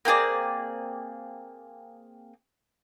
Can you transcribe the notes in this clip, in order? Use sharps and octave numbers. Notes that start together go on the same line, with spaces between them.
A#3 C4 G#4 D5